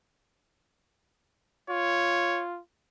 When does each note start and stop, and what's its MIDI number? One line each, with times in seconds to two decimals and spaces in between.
1.70 2.60 65
1.70 2.44 73